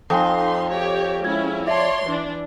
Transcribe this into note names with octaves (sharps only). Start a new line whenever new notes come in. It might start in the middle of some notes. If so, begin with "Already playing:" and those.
F2 D#4 A4 G5 G#5 C6
G4 C#5
G#3 C#4 E4 G#6
C#5 D5 E5 A5 C6
E3 D4